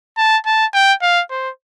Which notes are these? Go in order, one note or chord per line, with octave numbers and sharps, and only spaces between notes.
A5
A5
G5
F5
C5